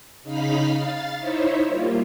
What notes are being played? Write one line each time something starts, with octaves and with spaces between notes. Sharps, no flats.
C#3 D#4 F5 B5 F6 B6
F5 A6
D#4 E4 C5 C#5 E5
G3 A#3 F4